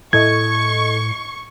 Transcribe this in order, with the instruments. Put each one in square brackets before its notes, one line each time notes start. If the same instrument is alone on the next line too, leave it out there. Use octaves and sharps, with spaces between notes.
[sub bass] A2 [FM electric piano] E4 A4 D#5 [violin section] C#6 [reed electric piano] G#6